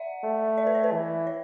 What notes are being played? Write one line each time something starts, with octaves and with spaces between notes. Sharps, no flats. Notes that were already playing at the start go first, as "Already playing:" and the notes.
Already playing: D5 E5 F#5
A3
D5
B4
C#5
B4
E3
C#5